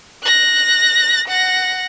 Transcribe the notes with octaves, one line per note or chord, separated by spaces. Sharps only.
F#6 A#6
F#5 A#6